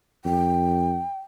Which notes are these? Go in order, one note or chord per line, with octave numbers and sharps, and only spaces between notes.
F2 G5